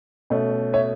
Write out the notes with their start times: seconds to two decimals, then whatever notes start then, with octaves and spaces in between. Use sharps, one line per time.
0.30 B2 A3 C#4
0.73 C#5 E5